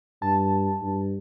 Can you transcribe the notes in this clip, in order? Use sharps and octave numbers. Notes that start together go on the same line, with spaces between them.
G2 A5
G2